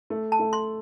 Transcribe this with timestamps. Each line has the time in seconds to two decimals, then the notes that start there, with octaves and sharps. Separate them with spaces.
0.10 A3
0.32 A5
0.39 A3
0.53 C6